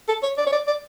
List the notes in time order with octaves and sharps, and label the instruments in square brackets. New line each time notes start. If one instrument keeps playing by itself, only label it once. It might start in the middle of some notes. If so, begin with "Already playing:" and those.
[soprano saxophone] A4
C#5
D5
C#5
D5
D5